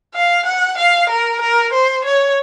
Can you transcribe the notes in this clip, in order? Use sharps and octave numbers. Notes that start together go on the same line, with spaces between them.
F5
F#5
F5
A#4
A#4
C5
C#5